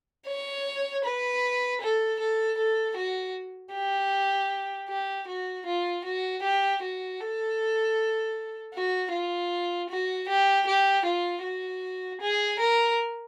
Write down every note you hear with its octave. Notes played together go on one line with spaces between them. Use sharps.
C#5
B4
A4
A4
A4
F#4
G4
G4
F#4
F4
F#4
G4
F#4
A4
F#4
F4
F#4
G4
G4
F4
F#4
G#4
A#4